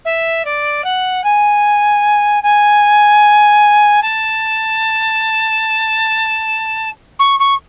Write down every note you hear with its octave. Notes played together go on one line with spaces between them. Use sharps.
E5
D5
F#5
G#5
G#5
A5
C#6
C#6